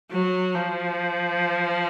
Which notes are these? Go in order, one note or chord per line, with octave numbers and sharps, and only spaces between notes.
F#3
F3